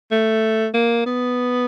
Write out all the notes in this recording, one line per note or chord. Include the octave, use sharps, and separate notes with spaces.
A3
A#3
B3